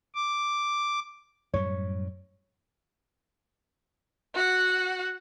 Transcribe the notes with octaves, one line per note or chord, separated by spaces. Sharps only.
D6
F#2 A2 G3 C#5
F#4 F#5